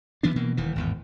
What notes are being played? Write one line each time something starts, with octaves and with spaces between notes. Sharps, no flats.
D2 E3 B3 D4
B2 E3 A#3
D#1 D#3 E3
G#1 E2 A2